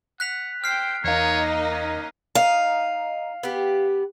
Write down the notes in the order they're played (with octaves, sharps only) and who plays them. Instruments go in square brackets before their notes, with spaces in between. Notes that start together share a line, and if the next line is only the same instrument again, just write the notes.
[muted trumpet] F#5 [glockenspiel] F#6 B6 F7
[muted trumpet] C5 [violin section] G5 [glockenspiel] F6 C7
[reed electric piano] E2 F5 [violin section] A#3 D#4 D#5 [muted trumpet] C#5
[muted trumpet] C#4
[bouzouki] D#4 [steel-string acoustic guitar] F5
[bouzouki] B3 G4